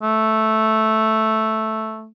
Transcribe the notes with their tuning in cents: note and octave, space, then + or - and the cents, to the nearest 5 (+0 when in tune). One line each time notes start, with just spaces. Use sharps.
A3 -5